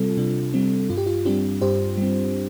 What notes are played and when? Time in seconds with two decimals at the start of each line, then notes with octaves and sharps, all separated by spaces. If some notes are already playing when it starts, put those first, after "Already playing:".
Already playing: C3 G3 C4 F4 A4
0.17 C3 D4
0.54 G3 C4
0.90 G2 F4
0.97 G4
1.06 F4
1.25 G3 C4 D4 G4
1.62 G2 G4 C5
1.97 G3 C4